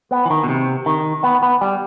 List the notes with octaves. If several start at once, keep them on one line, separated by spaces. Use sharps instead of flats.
B3
E3
D#3
B2
C3
D#3
B3
B3
G3